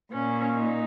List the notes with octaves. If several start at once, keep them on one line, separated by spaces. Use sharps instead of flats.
A#2 C#4
D#4